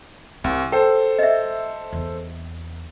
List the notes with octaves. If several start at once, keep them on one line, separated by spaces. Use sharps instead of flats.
C2 G3
A4 C5 G5
D#5 E5
E2